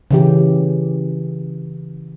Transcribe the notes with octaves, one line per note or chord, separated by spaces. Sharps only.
C#3 E3 G4